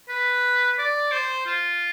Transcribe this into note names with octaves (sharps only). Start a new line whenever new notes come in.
B4
D5
C5
F4